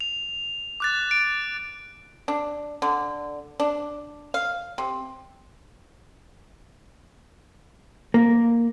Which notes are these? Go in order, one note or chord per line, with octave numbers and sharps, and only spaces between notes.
F7
D6 F#6 A6
D7
D4
D3
D4
F5
C3
A#3